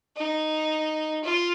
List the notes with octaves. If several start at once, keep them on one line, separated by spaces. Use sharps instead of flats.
D#4
F4